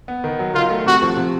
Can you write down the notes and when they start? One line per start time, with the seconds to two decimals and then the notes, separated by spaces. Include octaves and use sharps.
0.08 B3
0.24 D#3
0.39 F#3
0.54 D#3 F4
0.70 A3
0.86 C3 F#4
1.02 F3
1.17 C3